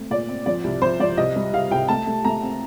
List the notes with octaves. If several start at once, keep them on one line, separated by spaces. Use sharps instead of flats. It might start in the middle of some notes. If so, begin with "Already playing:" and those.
Already playing: A3 C4
A#2 D5
C4
F3 D5
C2
F3 C5
F3 D5
C2 D#5
G3
C2 F5
C2 G5
A3 A5
A3
A3 A#5
C4